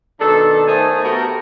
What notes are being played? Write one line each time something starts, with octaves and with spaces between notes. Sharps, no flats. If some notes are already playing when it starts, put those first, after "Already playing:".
B2 D#3 D4 A4
D#3 A3 D#4 C5 G#5 A5
A3 B3 F#4 G4 A#4